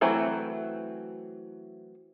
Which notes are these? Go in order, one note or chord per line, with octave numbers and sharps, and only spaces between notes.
E3 F#3 A3 C4 E4